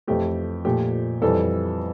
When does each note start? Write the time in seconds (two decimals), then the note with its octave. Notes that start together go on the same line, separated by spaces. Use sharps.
0.08 F2 E3 A3 G4
0.65 A#2 F3 A3 G4
1.22 F2 E3 G3 A4